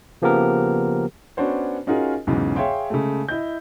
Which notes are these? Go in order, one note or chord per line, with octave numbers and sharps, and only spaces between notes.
C#3 F3 A#3 B3 G4 A#4
B3 C#4 D4 F#4 C5 C#5
C#4 D#4 F4 F#4 G#4 A#4
B1 E2 G#2 C#3
G#4 C#5 E5 F5 G5 C6
C#3 G#3 A3
E4 D#5 G6